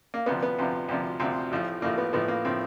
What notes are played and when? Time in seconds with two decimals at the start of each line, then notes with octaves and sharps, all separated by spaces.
0.14 A#3
0.26 D2 C3 F3 B3
0.43 B3
0.59 D2 C3 F3
0.88 D2 C3 F3
1.20 D2 C3 F3 C4
1.51 A1 A2 F3
1.82 A1 A2 F3 A#3
1.98 B3
2.13 A1 A2 F3 B3
2.28 A#3
2.45 A2 F3 C4